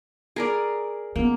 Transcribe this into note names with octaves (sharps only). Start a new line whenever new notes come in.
G#4 A#4 D5
A#3 B3 C#4